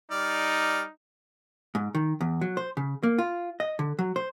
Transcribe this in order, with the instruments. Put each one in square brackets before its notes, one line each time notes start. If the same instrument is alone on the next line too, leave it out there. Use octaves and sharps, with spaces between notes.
[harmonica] G3 D5 F6 [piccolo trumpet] D#4
[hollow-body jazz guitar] G#2
D#3
E2
F#3
C5
C#3
A#3
F4
D#5
D3
F#3
C5